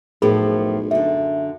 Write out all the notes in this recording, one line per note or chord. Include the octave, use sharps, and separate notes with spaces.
B1 F2 A2 F3 G#4 A#4 B5
F#2 D3 E5